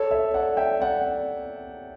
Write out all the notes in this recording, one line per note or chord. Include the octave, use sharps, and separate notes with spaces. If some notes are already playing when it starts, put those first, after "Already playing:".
Already playing: A4 C#5
C#5 E5
D5 F#5
E5 G5
D5 F#5